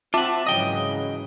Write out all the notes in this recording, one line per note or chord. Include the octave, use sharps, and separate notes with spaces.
C4 F4 E5 F#5 A5 D6
G#2 C#3 E3 F#3 D#5 G5 D#6